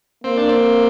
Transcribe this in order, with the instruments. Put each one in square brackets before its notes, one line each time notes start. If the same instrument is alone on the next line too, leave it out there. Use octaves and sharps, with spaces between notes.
[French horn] A#3 [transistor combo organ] C4
[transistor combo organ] D4
C4